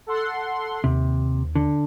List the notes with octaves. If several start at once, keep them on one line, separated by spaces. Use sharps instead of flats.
A4 F#5 C6
D#2 C3
D3